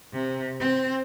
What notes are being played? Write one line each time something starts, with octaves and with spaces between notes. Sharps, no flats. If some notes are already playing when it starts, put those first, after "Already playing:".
C3
C4